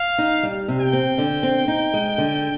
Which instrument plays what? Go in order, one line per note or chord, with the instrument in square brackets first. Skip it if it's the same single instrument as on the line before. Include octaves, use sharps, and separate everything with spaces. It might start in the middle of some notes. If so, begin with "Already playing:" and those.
Already playing: [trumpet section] F5
[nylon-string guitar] D#4
G3
C3
[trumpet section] G5
[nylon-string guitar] C4
D3
C4
D#4
G#3
D3